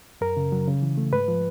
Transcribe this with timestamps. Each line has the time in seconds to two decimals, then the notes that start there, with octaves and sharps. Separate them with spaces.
0.21 F#2 A#4
0.37 C#3
0.52 F#3
0.67 C#3
0.82 E3
0.98 A3
1.12 G#2 B4
1.28 F3